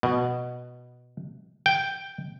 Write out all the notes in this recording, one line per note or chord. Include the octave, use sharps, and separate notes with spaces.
B2
G5